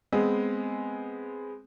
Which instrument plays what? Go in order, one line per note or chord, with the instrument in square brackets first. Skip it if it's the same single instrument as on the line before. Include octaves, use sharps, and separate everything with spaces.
[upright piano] G#3 B3 C4 G#4